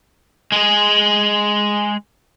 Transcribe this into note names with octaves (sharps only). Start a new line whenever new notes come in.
G#3 G#4